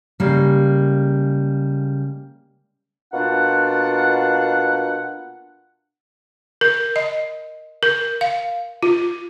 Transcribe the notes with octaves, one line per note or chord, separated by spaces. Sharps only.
C#3 G3 G#3 A#3
B2 A#3 D4 F4 F#5
A#4
D#5
A#4
F5
F4